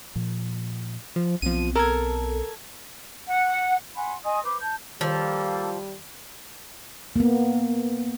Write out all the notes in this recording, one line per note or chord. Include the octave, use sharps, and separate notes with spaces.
A#2 F3
F3
B1 F3 B3 C4 D#7
A4 A#4 G#6
F#5
F#5 G#5 B5 C6
D#5 G#5 C6 D#6
B4 C5 D6
A5 G6
D#3 F3 G3 A#3 A4
A#3 B3